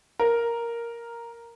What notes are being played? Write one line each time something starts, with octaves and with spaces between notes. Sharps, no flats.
A#4